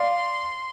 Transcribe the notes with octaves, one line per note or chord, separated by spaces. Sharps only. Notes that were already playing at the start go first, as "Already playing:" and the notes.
Already playing: D5 F5 C6